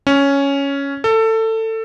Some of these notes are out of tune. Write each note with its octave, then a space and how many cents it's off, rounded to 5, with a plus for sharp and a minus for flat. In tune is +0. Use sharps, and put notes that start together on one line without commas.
C#4 +5
A4 +20